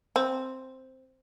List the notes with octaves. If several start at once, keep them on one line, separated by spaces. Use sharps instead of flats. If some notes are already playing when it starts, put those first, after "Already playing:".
C4